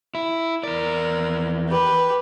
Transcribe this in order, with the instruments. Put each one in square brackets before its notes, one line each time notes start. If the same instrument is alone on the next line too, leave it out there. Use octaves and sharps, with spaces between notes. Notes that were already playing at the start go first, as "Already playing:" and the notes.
[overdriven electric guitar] E4
[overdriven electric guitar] E2 D5 [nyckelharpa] A#4
[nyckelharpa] G4 B4